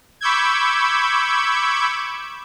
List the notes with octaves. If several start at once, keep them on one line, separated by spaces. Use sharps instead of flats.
B5 C#6 D6 E6 G6 G#6